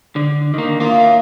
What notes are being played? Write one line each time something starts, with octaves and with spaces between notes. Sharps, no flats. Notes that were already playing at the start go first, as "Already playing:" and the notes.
D3
D#3 A#3
A2 A#3 F4